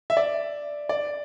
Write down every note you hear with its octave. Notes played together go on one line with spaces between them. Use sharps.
E5
D5
D5